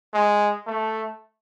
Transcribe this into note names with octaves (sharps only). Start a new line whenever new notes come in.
G#3
A3